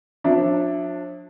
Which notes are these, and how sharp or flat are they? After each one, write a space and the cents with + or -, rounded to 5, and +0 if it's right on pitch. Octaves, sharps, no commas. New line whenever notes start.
F3 +45 D4 +0 E5 +10